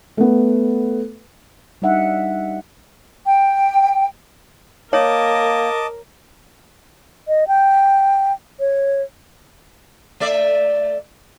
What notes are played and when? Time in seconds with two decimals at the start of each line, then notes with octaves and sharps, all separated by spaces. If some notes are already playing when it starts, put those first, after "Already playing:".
0.17 A3 B3
1.82 G3 D4 D#4 E5 F#5
3.26 G5
4.93 A#3 A#4 C#5 D#5 A5 D6
7.28 D#5
7.48 G5
8.60 C#5
10.20 A3 D5 E5